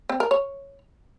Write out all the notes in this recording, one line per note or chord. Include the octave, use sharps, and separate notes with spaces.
C4
A#4
C#5